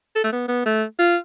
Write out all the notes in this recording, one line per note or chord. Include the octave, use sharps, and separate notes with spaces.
A4
A3
B3
B3
A3
F4